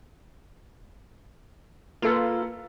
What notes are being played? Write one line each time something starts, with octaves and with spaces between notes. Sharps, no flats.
A#3 F4 A4 B4